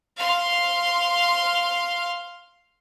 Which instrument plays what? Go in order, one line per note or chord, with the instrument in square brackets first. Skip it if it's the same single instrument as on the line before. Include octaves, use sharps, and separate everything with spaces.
[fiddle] F5 C6